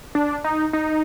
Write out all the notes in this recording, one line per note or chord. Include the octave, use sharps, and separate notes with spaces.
D4
D#4
D#4